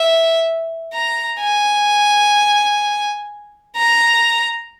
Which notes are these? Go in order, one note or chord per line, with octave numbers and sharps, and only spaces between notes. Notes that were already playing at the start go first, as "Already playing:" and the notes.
Already playing: E5
A#5
G#5
A#5